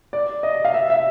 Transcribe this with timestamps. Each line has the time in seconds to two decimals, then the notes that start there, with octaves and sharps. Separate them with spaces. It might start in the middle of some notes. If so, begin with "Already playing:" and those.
0.13 D5
0.43 D#5
0.65 F5
0.74 E5
0.90 E5